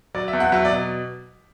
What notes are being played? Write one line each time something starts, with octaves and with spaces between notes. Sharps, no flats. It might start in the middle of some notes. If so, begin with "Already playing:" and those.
F#3 D5
E5
E2
F#5
F#3 E5
D5
B2